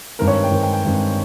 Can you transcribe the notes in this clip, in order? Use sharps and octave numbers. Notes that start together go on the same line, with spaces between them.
G2 D#3 G#3 C4 A#4
C#5
G5
G2 D#3 G#3 C4
G5
G5
G2 D#3 G#3 C4